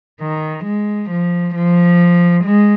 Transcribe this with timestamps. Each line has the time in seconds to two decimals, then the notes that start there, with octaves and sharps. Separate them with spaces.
0.21 D#3
0.65 G#3
1.11 F3
1.55 F3
2.45 G#3